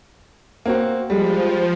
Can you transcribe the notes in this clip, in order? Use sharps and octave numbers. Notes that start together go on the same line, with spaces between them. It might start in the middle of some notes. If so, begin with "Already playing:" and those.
A#3 C4 F#4
F3 G3 G#3